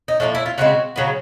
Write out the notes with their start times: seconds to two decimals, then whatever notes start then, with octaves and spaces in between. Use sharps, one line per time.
0.08 D#4
0.20 A2 F3 A#3 D4
0.35 E4
0.46 F4
0.58 C#3 F3 G#3 C4 F#4
0.96 C#3 F#3 B3